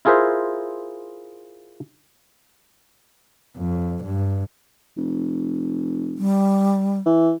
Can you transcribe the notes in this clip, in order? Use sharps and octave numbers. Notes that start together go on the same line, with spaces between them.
E4 F4 G#4 A#4 C5 E5
F2
G2
F1
G3
E3